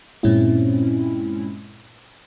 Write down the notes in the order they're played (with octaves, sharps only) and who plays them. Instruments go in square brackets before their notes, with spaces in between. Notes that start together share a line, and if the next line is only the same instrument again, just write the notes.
[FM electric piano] G2 A#2 G#3 C4 C#4 E4